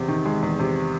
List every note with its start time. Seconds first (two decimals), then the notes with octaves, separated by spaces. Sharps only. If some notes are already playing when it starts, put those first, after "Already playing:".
Already playing: E2 C3
0.08 D#3
0.25 G#3
0.43 E2
0.59 C3